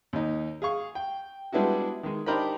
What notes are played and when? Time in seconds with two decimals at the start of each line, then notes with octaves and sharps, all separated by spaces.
0.13 D#2 D#4
0.62 G#4 F5 C#6
0.95 G5
1.52 G3 G#3 B3 D4 E4 F#4
2.03 D#3 G#3
2.26 D4 D#4 G4 A#4 C5 B5